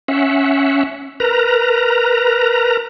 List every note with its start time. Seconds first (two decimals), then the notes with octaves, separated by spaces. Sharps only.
0.08 C#4 E5 F#5
1.20 A#4 B4 A#5